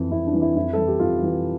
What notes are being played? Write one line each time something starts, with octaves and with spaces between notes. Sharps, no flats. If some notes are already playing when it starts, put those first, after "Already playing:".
Already playing: F2 E3
F2 E4
D4
E3
E4
F2 E4
E3 A4
G4
F2 F4
E3